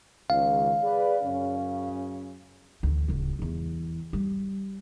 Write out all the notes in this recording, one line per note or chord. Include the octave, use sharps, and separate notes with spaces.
C#2 D#3 F5
G#4 B4 D5
F#2 C#3 C#4
D2 E3
D1 C#2
G1 E2
G3